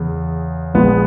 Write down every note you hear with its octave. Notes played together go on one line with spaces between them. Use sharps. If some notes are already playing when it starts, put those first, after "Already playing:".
Already playing: E2 C#3
A#1 A#2 F3 G#3 B3